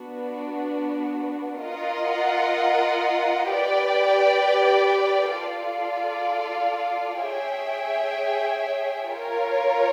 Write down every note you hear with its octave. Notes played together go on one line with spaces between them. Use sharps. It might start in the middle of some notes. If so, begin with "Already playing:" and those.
Already playing: B3 D4 F#4
F4 A#4 D#5 F#5
G4 B4 D5 G5
F4 A4 D5 F5
G#4 C#5 E5 G5
F4 A#4 C#5